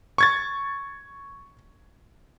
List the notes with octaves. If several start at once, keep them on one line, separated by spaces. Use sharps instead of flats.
C#6 G#6 A6